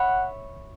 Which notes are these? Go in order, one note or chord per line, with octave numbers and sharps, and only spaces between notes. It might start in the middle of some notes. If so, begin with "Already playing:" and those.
Already playing: C#5 E5 F#5 B5